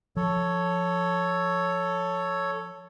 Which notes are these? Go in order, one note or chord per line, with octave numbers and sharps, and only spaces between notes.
F3 A4 C#5